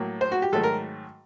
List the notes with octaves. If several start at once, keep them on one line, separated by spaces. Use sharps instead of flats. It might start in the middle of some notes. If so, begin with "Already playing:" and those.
Already playing: A2 F#3 A#3
C5
F#4
G4
G#2 D#3 F#3 A3 A4
A#4